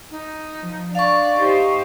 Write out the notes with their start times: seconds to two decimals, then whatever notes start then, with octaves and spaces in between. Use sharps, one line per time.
0.11 D#4
0.60 F3
0.95 D4 D5 F5 C#6
1.35 D#4 G4 C5